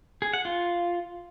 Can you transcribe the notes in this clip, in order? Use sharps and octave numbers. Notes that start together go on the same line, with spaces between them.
G#4
F#5
F4